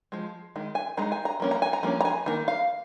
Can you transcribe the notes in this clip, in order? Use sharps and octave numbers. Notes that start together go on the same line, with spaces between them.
F3 G#3
D#3 G#3
G#5
D#3 G#3 D#4 A#5
G#5
A#5
F3 A#3 C#4
A#5
G#5
A#5
F3 A#3 C#4
A#5
G#5
D#3 A#3
F5